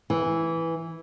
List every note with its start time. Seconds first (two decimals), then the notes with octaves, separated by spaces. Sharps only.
0.10 E3